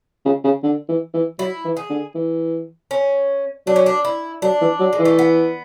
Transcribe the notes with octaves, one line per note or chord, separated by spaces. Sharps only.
C#3
C#3
D3
E3
E3
F#3 E4
E3
G#4
D3
E3
C#4
F#3 D4
C#4
D4
E4
F#3 D4
E3
F#3
G#3
E3
A3
B3